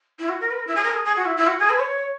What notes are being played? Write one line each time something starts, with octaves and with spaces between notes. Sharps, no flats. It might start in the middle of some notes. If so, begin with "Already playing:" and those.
E4
F#4
A#4
B4
A#4
E4
G#4
A#4
G#4
G#4
F#4
E4
E4
F#4
G#4
B4
C#5